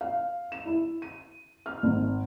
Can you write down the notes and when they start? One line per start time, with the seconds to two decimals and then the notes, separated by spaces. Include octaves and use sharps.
0.01 F5
0.52 E7
0.65 E4
1.02 D#7
1.66 F6
1.83 G#1